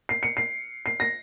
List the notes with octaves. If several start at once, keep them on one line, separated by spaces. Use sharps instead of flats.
C7
C#7
C7
C7
A#6